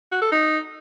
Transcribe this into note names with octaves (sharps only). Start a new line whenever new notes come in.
F#4
A4
D#4